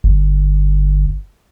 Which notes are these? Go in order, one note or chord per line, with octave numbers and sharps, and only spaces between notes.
G1